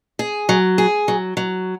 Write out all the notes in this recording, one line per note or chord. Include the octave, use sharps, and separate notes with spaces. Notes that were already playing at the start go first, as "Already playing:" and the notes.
G#4
F#3
G#4
F#3
F#3